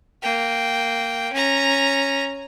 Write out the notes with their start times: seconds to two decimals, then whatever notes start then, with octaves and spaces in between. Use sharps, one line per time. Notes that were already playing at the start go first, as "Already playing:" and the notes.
0.23 A#3 G5
1.32 C#4 A#5